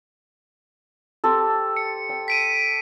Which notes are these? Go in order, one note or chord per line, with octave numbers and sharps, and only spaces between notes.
C4 G4 A4
C#7
G5
B6 D7 D#7